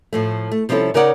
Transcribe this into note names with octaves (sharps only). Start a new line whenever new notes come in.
A2 F3 A3
A3
C3 F3 G3 C#4 E4 A4
C#3 D#4 A#4 C#5 D5 F#5